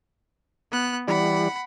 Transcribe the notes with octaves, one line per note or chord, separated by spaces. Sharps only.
B3 F#6
E3 G3 D5 F#5 B5